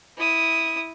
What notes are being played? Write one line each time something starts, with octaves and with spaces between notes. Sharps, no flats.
E4 D#6